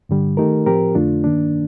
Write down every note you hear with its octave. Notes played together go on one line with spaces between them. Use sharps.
G2 D3 G3
D#3 A3 D#4 G4 A#4
A2 F3 C4 G4 A#4
F2 D3 A3 D4 F4
G2 D#3 A#3 D4